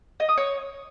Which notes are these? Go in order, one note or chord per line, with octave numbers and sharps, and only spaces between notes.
D#5
D#6
C#5